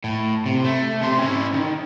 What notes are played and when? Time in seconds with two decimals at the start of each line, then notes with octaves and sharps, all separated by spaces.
0.04 A2
0.46 C3
0.64 A3
1.02 C3 C6
1.18 C#4 E4
1.54 D#3